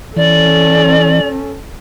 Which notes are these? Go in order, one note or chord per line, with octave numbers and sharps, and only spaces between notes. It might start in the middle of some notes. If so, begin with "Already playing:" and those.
E3 C#4 A4 D5